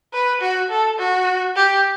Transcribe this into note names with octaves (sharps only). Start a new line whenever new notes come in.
B4
F#4
A4
F#4
G4